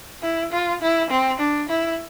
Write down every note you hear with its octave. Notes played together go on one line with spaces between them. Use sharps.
E4
F4
E4
C4
D4
E4